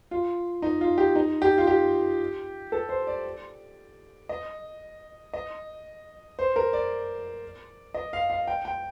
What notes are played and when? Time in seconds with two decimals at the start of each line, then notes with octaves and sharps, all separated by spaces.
0.11 F4
0.62 D#4
0.81 F4
0.98 G4
1.16 D#4
1.42 G4
1.58 F4
1.67 G4
2.72 A4
2.89 C5
3.07 D5
4.29 D#5
5.33 D#5
6.39 C5
6.56 A#4
6.73 D5
7.94 D#5
8.13 F5
8.30 F5
8.48 G5
8.65 G5